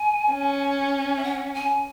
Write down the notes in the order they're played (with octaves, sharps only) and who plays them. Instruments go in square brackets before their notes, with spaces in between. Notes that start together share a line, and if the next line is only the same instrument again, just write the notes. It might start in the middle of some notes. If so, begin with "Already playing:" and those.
Already playing: [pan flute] G#5
[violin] C#4
[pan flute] E5
F#5
G#5